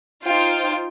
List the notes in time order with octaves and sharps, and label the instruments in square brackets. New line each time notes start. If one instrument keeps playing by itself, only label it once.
[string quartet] D#4 C5 G5 [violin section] F4